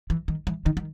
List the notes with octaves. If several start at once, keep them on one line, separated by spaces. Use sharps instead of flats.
E3
D#3
E3
D#3
D#3